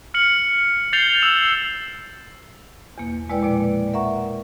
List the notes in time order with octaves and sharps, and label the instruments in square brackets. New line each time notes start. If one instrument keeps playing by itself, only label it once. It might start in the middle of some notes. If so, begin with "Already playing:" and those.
[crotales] F6 C#7 F#7
G6 A6 C7 F7 G7
E6 E7 F#7
[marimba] E2 B2 A#3
G#3 A#3 E4 B4 D5 G5
A#2 F3 D5
A#4 E5 F#5 A#5 C#6